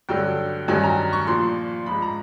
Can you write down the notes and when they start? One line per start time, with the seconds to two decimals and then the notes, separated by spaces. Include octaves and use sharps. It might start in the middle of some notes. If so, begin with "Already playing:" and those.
0.09 G2 D3 F#3 G5
0.68 G2 D#3 F#3 G#5
0.84 A#5
1.13 C#6
1.27 A#2 F3 C6
1.86 G#2 F3 B5
2.02 A#5